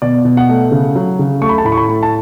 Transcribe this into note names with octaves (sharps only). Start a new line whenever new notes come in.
B2 D5
B2
F#5
A3
C#3
F#3
C#3
A3 C#6
B5
A5
A2 B5
C#6
B5
A3
A5